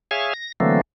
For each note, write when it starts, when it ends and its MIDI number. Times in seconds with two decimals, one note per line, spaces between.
0.11 0.33 68
0.11 0.33 73
0.11 0.33 76
0.11 0.33 77
0.11 0.33 80
0.34 0.52 94
0.60 0.81 50
0.60 0.81 52
0.60 0.81 54
0.60 0.81 57
0.60 0.81 58
0.60 0.81 60